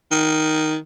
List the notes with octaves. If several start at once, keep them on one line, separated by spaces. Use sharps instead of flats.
D#3